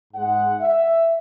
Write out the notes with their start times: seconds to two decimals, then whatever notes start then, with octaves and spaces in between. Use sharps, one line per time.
0.13 G#2 G#3 F#5
0.60 E5